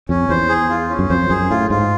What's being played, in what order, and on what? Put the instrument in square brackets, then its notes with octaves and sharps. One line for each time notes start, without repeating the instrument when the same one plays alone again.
[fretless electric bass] F2 [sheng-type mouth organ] C#4
[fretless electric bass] E2 [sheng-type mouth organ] C5
[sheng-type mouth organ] G#4
F4
C#4
[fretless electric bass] F#2
[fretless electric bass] F2 [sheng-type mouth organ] C5
[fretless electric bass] F#2 [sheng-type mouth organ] G#4
[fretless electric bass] A2 [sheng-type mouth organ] F4
[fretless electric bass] G#2 [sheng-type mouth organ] F4